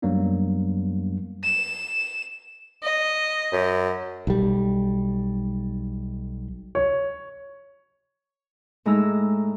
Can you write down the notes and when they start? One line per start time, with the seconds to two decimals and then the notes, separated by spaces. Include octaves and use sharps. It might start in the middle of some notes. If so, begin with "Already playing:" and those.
0.02 F#2 F#3 G3 A#3 B3 D4
1.44 E7
2.83 D#5
3.52 F#2
4.27 B1 G3
6.75 C#5
8.85 A2 G#3 D#4 A#5 E6